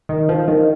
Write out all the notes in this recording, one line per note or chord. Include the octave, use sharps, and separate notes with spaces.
D#3
F3
D#3